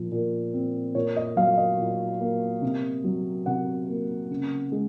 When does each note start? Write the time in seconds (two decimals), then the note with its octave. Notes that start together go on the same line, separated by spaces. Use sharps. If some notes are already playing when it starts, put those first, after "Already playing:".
Already playing: A#2 F3
0.12 A#2
0.54 C4
0.95 A#2 C#5
1.16 D#5
1.36 F#3 F5
1.57 D#5
1.79 A#2
2.21 A#3
2.62 C3
3.04 F#3
3.46 C3 F#5
3.88 A#3
4.30 C#3
4.72 G#3